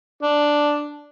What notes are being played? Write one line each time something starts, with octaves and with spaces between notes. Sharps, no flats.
D4